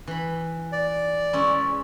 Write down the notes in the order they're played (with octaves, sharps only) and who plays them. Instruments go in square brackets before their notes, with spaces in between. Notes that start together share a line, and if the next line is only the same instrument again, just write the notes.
[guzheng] E3 B5
[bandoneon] D5
[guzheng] G#3 C#4 E4